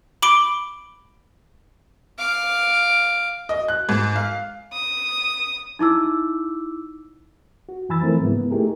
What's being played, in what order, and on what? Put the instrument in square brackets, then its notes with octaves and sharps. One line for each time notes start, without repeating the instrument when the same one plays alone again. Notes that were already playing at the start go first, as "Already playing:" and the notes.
[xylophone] B5 D6 D7 G7
[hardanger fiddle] F5 D6
[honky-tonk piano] D#5
F#6
G#2
F5
[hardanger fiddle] D#6
[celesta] D#4 E4 D6 E6
[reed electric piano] F#4
F#2 E3 G#5 B5 E6 A6
E3 F3 A3 C4 E4 A#4
G#2 C#3 G#3 A#3 B3 E4
B3
A3 D#4 E4 G4 G#4 A#4